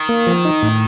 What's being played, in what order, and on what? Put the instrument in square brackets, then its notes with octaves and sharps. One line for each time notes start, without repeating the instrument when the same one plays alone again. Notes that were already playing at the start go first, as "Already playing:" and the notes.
Already playing: [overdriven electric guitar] D#3
[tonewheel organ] A#3
F3
D#4
A2